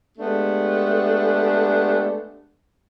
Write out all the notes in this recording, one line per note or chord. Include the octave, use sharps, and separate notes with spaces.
G#3 A3 B3 D4 G4